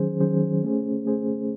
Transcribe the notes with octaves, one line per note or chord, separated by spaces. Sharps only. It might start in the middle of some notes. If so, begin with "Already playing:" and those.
Already playing: D#3 F#3 C#4 G#4 C5
D#3 F#3 C#4 G#4 C5
A3 C#4 G#4 C5
A3 C#4 G#4 C5